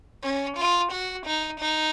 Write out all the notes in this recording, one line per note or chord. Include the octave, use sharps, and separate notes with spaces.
C#4
F4
F#4
D#4
D#4